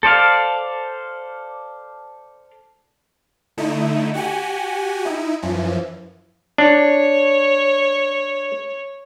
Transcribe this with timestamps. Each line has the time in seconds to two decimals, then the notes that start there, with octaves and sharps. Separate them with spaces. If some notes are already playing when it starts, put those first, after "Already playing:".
0.03 A4 C5 D5 F5
3.58 D3 A3 D#4 E4
4.14 F#4 G4 F#5 G#5
5.05 D#4 E4
5.42 F#2 E3 F3
6.58 D4 C#5